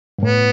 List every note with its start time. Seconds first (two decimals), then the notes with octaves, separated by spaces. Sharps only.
0.19 G2
0.23 A2 B3